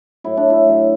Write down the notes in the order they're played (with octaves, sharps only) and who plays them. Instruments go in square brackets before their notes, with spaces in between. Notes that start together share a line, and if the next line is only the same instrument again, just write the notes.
[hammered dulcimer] A2 F#3 E4
D4
E4
A2 F#3